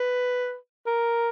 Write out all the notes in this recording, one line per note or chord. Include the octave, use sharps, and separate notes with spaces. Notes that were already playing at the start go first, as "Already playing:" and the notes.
Already playing: B4
A#4